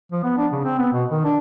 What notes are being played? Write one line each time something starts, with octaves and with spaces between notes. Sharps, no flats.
F3
B3
D4
C#3
C4
B3
B2
D#3
D4